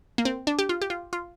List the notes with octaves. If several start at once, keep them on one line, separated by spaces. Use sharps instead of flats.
A#3
C4
D4
G4
F4
G4
F4
F4